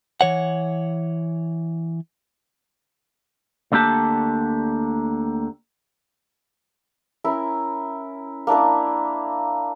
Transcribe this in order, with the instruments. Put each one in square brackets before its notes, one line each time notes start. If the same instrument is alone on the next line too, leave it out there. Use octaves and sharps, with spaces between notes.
[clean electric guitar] E3 C#5 F#5
D2 D3 A#3 G4 A5
[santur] C#4 E4 A#4
A#3 D4 E4 A#4